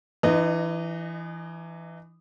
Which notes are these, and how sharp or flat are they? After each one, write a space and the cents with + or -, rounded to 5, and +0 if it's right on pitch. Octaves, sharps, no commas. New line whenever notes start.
E3 +15 D#4 -35 D#5 -15